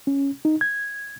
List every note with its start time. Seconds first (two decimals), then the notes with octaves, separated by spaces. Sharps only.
0.07 C#4
0.45 D#4
0.61 G#6